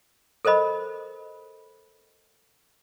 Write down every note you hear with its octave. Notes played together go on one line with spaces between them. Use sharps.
A4 A#4 C5 D#5 B5